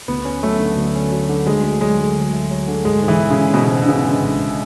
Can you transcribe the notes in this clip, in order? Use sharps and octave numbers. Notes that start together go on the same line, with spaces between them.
D2 B3
C#4
F#3 A3
D3
D2
C#4
F#3
D3
D2 G#3
A3
F#3 G#3
D3
D2
A3
F#3
D3
G#2 G#3
G#2
E3
B3
C#3
G#3
G#2 B2
G#2
D3
C#3 B3
G#3
A1